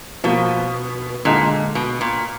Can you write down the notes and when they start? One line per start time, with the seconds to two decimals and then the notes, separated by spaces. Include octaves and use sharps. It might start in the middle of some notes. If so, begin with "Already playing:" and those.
0.24 B2 F3 A#3 F4
1.25 A#2 D3 G#3 D#4
1.75 B2
2.01 A#2